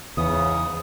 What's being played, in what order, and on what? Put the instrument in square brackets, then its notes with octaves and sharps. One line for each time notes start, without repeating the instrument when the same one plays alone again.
[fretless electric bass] E2 E3 [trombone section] G#2 C#3 [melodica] B3 D#6